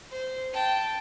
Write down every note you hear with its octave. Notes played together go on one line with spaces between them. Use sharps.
C5
G5 A5